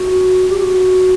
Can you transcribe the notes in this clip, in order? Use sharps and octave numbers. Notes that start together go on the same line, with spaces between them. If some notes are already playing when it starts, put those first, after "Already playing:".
Already playing: F#4
G4
F#4